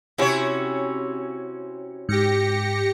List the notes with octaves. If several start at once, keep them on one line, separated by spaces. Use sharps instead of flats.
C3 C#4 E4 F#4 C#5
G#2 G4 A#6 C#7